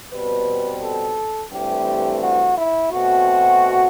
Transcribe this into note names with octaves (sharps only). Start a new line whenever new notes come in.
B2 G3 C4 B4
A4
G2 E3 A3 C4 G4
F#4
E4
B2 A3 C4 F#4